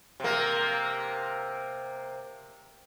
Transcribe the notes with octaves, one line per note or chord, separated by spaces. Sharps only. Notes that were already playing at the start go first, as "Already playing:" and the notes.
C3 A#3